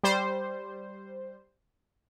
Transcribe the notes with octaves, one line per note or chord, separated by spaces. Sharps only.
G3 C5